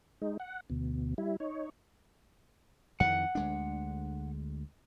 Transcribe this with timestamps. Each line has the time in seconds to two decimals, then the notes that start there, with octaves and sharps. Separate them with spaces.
0.22 G#3 D#4
0.40 F#5
0.70 D2 B2
1.18 G3 E4
1.40 D#4 C#5
3.00 F2 D#3 E3 F#5
3.35 D2 G#3 D4